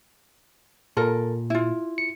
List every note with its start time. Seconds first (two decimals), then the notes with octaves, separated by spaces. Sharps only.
0.97 A#2 A4 A#4
1.50 E4 F4
1.98 C#7